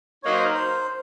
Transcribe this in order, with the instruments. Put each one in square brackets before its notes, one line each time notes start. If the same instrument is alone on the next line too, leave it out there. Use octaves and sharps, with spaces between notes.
[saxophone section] F#3 A#3 D#4 [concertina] C#5
[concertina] C5
A#4
C5